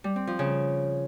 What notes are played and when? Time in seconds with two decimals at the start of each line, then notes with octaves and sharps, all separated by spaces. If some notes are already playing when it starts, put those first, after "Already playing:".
0.04 G3
0.16 C4
0.27 F3
0.39 C#3